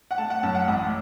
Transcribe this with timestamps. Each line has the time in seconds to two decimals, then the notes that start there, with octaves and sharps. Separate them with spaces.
0.11 F#5
0.18 A3 A5
0.30 F#5
0.43 F#2 A5
0.55 F#5
0.68 A1 F#5